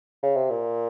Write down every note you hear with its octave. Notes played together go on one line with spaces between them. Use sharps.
C#3
C3
A#2